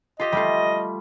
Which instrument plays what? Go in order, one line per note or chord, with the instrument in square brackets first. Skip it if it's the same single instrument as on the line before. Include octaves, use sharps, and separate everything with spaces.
[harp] F4 G4 [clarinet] D#5
[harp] G3 A3 F4